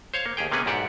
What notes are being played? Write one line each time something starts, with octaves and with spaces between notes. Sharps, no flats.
C5 C#5 F5
A#3
D#2 G4 G#4 G5
C3 A#3 B3 C#4 G#4 B4
B1 G#2 G4 D5 E5 F#5